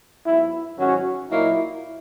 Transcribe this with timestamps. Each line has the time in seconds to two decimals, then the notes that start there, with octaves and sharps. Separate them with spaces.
0.26 G#2 F#3 B3 E4
0.78 G#2 D#3 F#3 C#4 F#4
1.30 A#2 F#3 A#3 D#4 E4